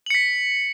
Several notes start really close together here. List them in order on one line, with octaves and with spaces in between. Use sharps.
F#7 C#7 B6